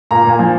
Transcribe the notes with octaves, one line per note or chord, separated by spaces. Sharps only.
A#2 A#5
A#2
G#5
F3